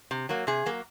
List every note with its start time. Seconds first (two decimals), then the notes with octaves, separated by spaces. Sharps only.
0.11 C3
0.29 F#3 A#3
0.47 C3 G#4
0.66 F#3 A#3